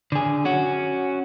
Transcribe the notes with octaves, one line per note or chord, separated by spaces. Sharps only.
D3 G#4
C#4 F#4